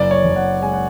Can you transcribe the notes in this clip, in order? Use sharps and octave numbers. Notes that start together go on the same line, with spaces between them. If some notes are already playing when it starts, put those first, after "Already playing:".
Already playing: F#1 D5
C#5
F#1
F#5
G#3 G#5
F#5